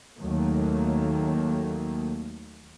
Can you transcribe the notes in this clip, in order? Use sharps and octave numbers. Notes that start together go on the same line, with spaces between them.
D#2 D#3 F#3 A3 A#3